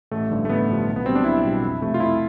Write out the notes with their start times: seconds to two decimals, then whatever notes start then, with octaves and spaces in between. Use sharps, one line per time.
0.11 A1 A3
0.30 G2 D3 F3
0.45 A3
0.49 A1 B3
0.68 G2 D3 F3
0.87 B1
0.96 B3
1.06 B2 G3 C4
1.15 D4
1.24 B1 E4
1.44 B2 G3
1.62 F2
1.81 C3 F3 A3
1.94 F4
2.00 F2 E4